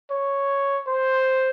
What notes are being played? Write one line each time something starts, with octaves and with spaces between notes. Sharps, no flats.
C#5
C5